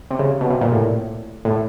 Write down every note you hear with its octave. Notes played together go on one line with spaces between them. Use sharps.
C3
C#3
B2
C3
A#2
A2
A2